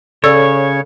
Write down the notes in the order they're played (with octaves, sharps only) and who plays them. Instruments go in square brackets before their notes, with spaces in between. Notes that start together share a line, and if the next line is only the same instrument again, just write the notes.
[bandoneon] C#3 [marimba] A4 D5 E6 [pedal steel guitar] C#5